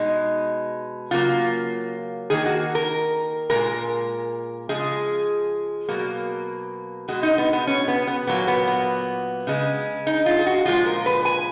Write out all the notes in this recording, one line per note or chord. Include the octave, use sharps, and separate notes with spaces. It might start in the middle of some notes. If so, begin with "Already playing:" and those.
Already playing: B2 G#3 D#4
C#3 F#3 A#3 F4
D#3 A#3 G#4
F#4
A#4
A#2 G#3 A#4
C#3 F3 G#3 G#4
B2 F#3 A#3
B2 G#3 F#4
D#4
B3
B3
C#4
B3
B3
A#2 F#3 A#3 B3
B3
B3
C#3 G#3
D#4
F4
G#4
F#4
A#2 F3 G#3 F4
A#4
B4
G#5